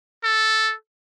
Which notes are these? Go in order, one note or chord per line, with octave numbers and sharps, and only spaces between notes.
A4